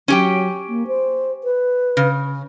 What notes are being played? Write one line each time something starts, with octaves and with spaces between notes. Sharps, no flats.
F#3 C#4 G4 G5
A#3
C5
B4
C#3